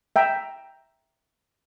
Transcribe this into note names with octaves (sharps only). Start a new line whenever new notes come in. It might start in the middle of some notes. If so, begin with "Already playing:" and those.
E5 G5 A#5